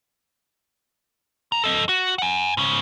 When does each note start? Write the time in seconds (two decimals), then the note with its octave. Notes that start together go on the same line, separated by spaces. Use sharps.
1.52 D2 A#5
1.64 A4 D#5
1.89 F#4
2.18 F#5 G#5
2.57 G#2 C#3